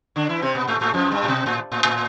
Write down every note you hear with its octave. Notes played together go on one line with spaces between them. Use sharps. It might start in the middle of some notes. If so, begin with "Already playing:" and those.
D3 D4
E3 E4
C3 C4
B2 B3
A2 A3
A2 A3
F2 F3
G2 G3
A2
B2
A2
A2
A2